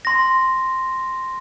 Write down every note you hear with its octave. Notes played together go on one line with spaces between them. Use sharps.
C6 A#6